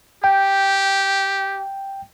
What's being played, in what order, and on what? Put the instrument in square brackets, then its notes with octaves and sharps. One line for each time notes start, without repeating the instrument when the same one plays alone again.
[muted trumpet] G4 [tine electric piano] G5